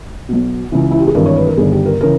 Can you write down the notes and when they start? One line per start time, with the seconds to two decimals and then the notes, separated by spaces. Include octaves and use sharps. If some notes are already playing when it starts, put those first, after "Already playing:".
0.29 B1 B2
0.72 C#2 C#3 E3
0.91 E4
0.99 G4
1.07 G#4
1.15 G#1 G2 E3 A#4
1.26 C#5
1.36 B4
1.47 A#4
1.57 G1 G2 D#3 G#4
1.72 G4
1.86 A#4
2.01 C#3 E3 A#4